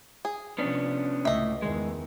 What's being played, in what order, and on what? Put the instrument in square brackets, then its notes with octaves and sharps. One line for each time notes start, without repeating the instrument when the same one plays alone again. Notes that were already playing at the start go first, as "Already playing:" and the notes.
[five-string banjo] G#4
[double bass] C3 F3 [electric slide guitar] B3 C#4 D4
[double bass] C#2 [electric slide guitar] A2 [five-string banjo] D#5 E5
[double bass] E2 D#3 [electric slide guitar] G#3